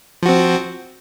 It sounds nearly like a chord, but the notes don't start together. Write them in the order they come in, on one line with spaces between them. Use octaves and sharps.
F3 F#4 C4